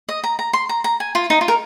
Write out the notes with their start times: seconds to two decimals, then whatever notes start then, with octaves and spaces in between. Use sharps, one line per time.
0.09 D#5
0.24 A#5
0.39 A#5
0.53 C6
0.69 A#5
0.84 A#5
1.00 G#5
1.15 F4
1.30 D#4
1.41 F4
1.48 A#4